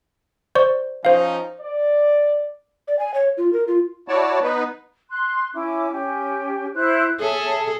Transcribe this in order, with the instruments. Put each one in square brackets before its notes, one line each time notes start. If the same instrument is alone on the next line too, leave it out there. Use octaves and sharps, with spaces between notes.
[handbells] C5 D5 C#6
[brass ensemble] F3 C#4 D#4 [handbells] C5 F5
[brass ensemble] D5
[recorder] D5
G#5
C#5
F4
A#4
F4
[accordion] E4 F#4 C#5 D5 A5
B3 D#4 B4
[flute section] C6 F#6
C#4 E4 D6
C#4 G4
E4 C5 F#6
[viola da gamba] G#4 A4 [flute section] C#5 E5 A5